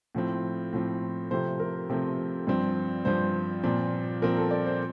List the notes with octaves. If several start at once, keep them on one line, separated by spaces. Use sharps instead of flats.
A2 F3 C4
A2 F3 C4
C3 F3 A3 C4 C5
A#4
C3 F3 A3 C4
G2 F3 C4
G2 F3 C4 C5
A#2 F3 C4
A#2 F3 C4 A#4
A4
D5
C5